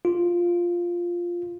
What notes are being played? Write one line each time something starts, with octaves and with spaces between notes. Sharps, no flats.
F4